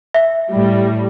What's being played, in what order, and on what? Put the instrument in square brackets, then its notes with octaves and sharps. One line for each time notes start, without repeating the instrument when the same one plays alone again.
[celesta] E5
[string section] A2 G3